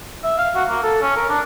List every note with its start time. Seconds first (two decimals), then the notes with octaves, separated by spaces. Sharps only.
0.24 E5
0.38 F5
0.55 F#4
0.69 A#3
0.83 A4
1.02 C#4
1.16 A#4
1.29 D4